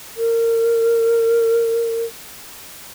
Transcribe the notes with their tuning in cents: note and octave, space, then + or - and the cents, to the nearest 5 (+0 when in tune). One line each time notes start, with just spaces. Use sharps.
A#4 -25